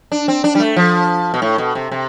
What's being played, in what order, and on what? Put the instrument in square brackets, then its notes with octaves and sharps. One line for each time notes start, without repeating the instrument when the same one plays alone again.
[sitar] D4
C4
D4
G3
A3
F3
B2
A2
B2
C3
C3